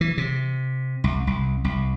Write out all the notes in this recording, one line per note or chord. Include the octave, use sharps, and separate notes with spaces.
E3
C3
C2
C2
C2